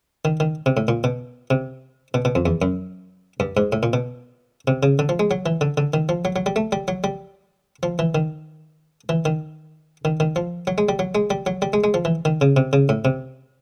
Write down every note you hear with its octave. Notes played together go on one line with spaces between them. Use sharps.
D#3
D#3
C3
A2
A#2
B2
C3
B2
B2
F2
E2
F#2
G2
G#2
A2
A#2
B2
C3
C#3
D3
F3
G#3
F#3
E3
D3
D3
D#3
F3
F#3
F#3
G3
A3
G3
F#3
G3
F3
E3
D#3
E3
D#3
D#3
D#3
F3
F#3
G#3
G3
F#3
G#3
G3
F#3
G3
G#3
G#3
F3
E3
D#3
C#3
C3
C#3
A2
C3